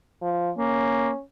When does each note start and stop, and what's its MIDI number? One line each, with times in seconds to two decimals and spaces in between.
0.22 0.50 53
0.58 1.11 58
0.58 1.21 61